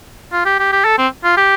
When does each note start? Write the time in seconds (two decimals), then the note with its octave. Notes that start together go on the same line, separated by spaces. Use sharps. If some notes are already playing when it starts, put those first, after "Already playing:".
0.33 F4
0.45 G4
0.59 G4
0.72 G4
0.85 A4
0.98 C4
1.24 F4
1.37 G4